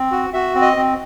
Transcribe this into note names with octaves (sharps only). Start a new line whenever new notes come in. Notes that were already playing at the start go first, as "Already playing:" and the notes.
Already playing: C4
F#4
F#4 E5
C4
D#5
C4